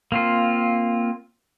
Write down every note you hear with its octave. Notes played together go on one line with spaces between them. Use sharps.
A#3 C4 F4